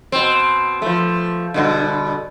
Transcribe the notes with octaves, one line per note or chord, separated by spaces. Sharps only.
B2 C4
F3 A3
G2 B2 D3